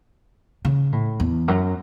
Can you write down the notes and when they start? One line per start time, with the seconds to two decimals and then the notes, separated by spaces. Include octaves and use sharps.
0.65 C#3
0.92 A2
1.20 E2
1.48 F#2